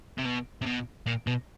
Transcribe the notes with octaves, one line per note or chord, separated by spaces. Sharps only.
C3
B2
C3
B2
A#2
B2